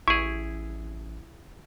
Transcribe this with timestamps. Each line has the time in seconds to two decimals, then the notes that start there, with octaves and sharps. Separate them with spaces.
0.08 A1 E4 G#4 C#6